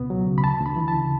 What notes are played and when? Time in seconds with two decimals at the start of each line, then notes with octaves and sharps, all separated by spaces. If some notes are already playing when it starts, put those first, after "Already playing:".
Already playing: C#2 B2 B3
0.10 F#3
0.27 C#3
0.38 B5
0.44 D2 A5
0.61 D2 B5
0.76 E3
0.88 A5
0.94 C#3